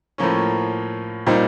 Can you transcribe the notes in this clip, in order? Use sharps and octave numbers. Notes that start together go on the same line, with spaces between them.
A2 F3 A#3 C#4
A#2 G3 C4 D#4